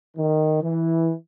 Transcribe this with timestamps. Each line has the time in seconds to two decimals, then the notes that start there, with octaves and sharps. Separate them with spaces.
0.17 D#3
0.63 E3